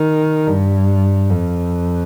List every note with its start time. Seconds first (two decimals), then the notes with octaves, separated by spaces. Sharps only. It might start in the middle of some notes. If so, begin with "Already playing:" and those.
Already playing: D#3
0.46 G2
1.31 F2